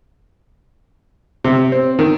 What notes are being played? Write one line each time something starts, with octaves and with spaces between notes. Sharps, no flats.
C3
C4
D#3